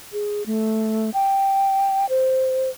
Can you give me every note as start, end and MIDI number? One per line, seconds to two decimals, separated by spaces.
0.13 0.46 68
0.46 1.10 57
1.14 2.06 79
2.09 2.69 72